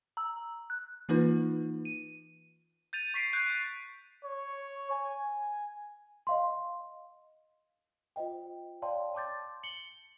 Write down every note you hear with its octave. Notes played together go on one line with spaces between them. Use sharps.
A#5 E6
F#6
E3 A#3 D#4 F4 B4
D#7
G6 A6 D#7 F7
C#6 B6 C7 D7
F#6 G6 C7
C#5
G#5
D#5 F5 C6
F4 C5 D#5 G5
C#5 D5 F5 G5 A5 C6
A5 C6 D6 G6 A6
C#7 F#7 G7